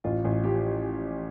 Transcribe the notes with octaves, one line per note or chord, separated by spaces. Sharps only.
A1 F4
A1
F3 G4